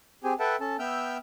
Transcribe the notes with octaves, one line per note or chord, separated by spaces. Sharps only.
C4 G4 G#4 G#5
A4 B4 E5 F#5 G5 A5
C#4 A4 A5
B3 E5 G5 E6 F6 G6